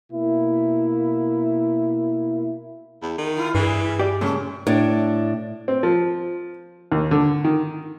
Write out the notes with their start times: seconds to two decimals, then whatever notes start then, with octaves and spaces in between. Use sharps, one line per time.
0.12 B2 A#3 E4
3.02 E2
3.18 D#3
3.37 E4 F4
3.55 G2 E3 G3 G#4
3.99 G4 D5
4.21 A#2 C#3 G#3 A3 C#4
4.67 A2 D4
5.68 C4
5.83 F3
6.92 D#2
7.11 D3
7.44 D#3